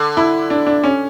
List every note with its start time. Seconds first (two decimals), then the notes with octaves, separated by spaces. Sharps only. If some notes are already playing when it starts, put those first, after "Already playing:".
Already playing: D3
0.17 E4
0.50 D4
0.67 D4
0.84 C#4